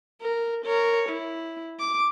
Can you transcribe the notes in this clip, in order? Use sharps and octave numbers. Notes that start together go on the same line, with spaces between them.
A#4
A#4 C#5
E4
D6